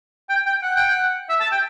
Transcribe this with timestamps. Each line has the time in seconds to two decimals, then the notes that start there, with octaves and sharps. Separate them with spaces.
0.29 G5
0.46 G5
0.62 F#5
0.76 G5
0.90 F#5
1.29 E5
1.40 A5
1.51 G5